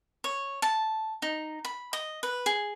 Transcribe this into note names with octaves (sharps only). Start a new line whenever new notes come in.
C#5
A5
D#4
B5
D#5
B4
G#4